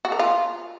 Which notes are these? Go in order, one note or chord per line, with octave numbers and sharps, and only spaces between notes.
F#4
A#4
F4